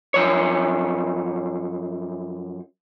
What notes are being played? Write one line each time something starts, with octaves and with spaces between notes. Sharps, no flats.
F#2 F3 C#5